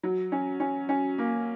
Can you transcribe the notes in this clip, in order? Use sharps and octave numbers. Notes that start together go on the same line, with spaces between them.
F#3
C#4
C#4
C#4
A#3